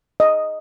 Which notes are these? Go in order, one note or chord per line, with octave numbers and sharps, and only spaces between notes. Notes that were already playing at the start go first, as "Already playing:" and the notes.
D#5